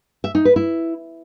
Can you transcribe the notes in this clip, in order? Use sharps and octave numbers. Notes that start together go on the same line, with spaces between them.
E5
D#4
B4
E4